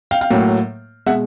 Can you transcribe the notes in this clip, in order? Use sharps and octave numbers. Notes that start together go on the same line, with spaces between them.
F5 G5
F5 G5
A2 F#3 A#3
B2 G#3 E5 F#5